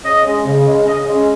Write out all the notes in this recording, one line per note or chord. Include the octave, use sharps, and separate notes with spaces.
C#3 D#5
G#3 C#4
C#3
G#3 C#4
C#3 D#5
G#3 C#4